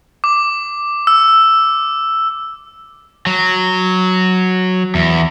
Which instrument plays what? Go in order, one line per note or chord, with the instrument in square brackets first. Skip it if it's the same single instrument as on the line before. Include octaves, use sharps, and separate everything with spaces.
[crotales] D6
E6
[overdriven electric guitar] F#3
E2